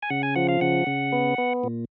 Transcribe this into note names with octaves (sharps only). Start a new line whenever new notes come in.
G#5
C#3 F#5
G#5
F3 F#5
F5
C#3 F#5
C#3
B3
B3
A#2